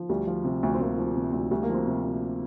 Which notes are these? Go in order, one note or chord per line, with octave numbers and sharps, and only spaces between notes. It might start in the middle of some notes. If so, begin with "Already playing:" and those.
Already playing: F3
D2 G3
F3
C3
D2
C4
D2 A#3
F3
C3
D2
D2 G3
A#3
F3
C4
C3
D2